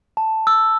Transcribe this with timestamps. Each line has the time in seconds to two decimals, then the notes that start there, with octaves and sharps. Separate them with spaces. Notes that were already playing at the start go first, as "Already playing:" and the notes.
0.17 A5
0.47 E6